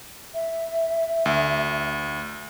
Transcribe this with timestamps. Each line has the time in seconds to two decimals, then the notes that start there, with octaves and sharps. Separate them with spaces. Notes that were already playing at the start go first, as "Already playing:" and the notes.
0.34 E5
1.26 D2